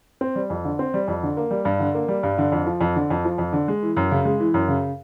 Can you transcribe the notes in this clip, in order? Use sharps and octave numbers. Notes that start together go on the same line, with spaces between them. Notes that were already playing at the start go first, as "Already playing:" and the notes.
C4
G3
F2
D3
C4
G3
F2
D3
A#3
G3
G2
D3
A#3
G3
G2
D3
F2
F3
F2
D3
F2
F3
F2
D3
G#3
E3
F#2
C#3
G#3
E3
F#2
C#3